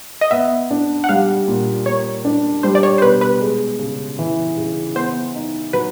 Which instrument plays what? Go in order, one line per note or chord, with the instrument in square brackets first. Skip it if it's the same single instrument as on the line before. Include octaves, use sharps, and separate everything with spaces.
[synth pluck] D#5
[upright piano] B3 [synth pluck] E5
[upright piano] D4
[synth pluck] F#5
[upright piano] G3 [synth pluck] F5
[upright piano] A#2
[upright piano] A#3 [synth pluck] C#5
[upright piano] D4
[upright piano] G3 [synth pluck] C5
[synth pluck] D5
C#5
C5
[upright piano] B2 [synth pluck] B4
[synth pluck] B4
[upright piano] G#3
C#3
E3
C#3
[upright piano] B3 [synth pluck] C5
[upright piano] D#4
[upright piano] F#3 [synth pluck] B4